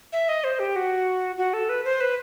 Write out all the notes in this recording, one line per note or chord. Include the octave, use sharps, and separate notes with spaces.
E5
D#5
C5
G4
F#4
F#4
A4
B4
C5
B4